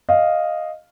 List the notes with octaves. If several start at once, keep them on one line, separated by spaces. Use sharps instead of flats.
D#5 F5